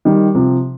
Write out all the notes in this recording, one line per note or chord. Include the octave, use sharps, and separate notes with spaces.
D#3 G3
C3 F3